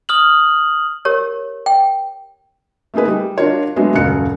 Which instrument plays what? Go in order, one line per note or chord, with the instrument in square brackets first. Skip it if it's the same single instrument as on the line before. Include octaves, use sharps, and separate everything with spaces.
[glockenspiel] D#6 F6 F#7
[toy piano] G4 A#4 C#5
G5
[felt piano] A3 A#3 D#4 G#4 B4
G3
D4 F4 F#4 A#4 C#5
F#3 G#3 A3 B3 D4
D#1 F#2 C#3 F5 F#6 C#7